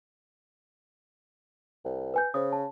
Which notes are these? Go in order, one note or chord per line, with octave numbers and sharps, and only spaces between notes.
C2
B4 G#5 G6
C#3 C5 D#6
A5